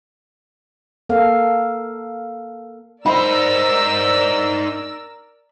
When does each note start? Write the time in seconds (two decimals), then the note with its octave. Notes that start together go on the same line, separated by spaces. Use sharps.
1.09 A#3 A4 F5
3.06 D#4 A#4 C5 D5 B5 E6